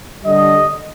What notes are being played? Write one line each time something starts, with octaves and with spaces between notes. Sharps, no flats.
D3 G3 D#5